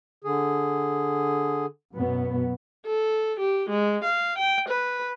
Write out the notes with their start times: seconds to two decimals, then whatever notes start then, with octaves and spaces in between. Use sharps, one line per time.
0.24 D3 G#4
1.94 F#2 B2 B3
2.86 A4
3.40 G4
3.69 G#3
4.04 F5
4.38 G5
4.69 B4